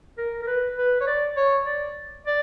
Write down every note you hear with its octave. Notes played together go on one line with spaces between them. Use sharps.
A#4
A#4
B4
B4
C#5
D5
C#5
D5
D5